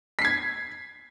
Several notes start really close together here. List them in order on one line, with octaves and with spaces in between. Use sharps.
B6 C7 G#6